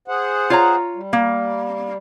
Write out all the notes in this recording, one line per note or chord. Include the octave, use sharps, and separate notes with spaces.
G#4 C5 F#5
F4 C#5 A#5
G3
A#3